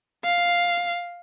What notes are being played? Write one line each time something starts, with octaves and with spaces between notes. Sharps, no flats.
F5